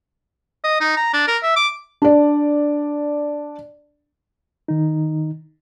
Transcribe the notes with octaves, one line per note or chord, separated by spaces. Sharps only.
D#5
D#4
A#5
D4
A#4
E5
D6
D4 D5
D#3 D#4